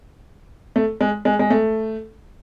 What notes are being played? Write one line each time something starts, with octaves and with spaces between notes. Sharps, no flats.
A3
G#3
G#3
G#3
A3